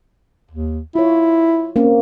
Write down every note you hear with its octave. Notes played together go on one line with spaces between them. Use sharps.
D#2
E4 F4 C#5
A#3 C4 C#4